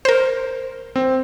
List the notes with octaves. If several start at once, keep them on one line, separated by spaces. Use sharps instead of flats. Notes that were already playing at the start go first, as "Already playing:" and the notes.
A#4 C5
C4